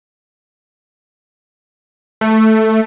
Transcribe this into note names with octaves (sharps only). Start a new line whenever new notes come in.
A3